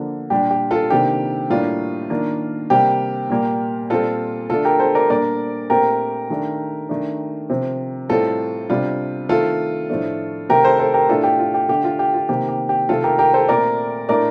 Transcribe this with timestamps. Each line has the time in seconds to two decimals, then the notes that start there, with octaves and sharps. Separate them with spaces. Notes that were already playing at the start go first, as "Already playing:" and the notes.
Already playing: D3 F3 A#3 D4
0.30 A#2 G3 D4 G4
0.50 G4
0.71 F4 A4
0.90 C3 D#3 A#3 D4 G4
1.50 A2 G3 A#3 D4 F4
2.10 D#3 A#3 D4
2.70 C3 G3 A#3 G4
3.30 A#2 G3 A#3
3.90 A#2 G3 C4 F4 A4
4.50 D3 A3 D4 F4 A4
4.65 G4 A#4
4.79 A4 C5
4.95 A#4 D5
5.10 A#2 G3 A#3 D4 A#4 D5
5.70 A#2 A3 C4 G4 A#4
6.30 D#3 A3 D4
6.89 D#3 A3 D4
7.50 C3 F3 C4
8.09 A2 G3 C4 F4 A4
8.70 C3 G3 D4 F4
9.29 D#3 A3 C4 F4 A4
9.89 A2 F3 A3 D4
10.49 C3 D#3 A3 G4 A#4
10.64 A4 C5
10.79 A4 C5
10.94 G4 A#4
11.09 A2 A3 D4 F4 A4
11.23 G4
11.39 F4
11.54 G4
11.69 D3 A3 D4 G4
11.84 F4
11.99 G4
12.14 F4
12.29 C3 D#3 A#3 G4
12.48 G4
12.69 G4
12.89 C3 D#3 A3 C4 F4 A4
13.04 G4 A#4
13.18 G4 A#4
13.34 A4 C5
13.48 A#2 A3 C4 A#4 D5
14.09 A2 A3 D4 A#4 D5